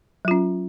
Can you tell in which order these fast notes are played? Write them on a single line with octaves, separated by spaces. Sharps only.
F#3 F4 C#4